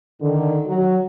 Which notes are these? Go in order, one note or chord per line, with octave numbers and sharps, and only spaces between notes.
D3 D#3
F#3